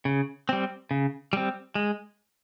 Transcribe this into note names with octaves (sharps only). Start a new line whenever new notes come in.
C#3
G3 C4
C#3
G3 C4
G#3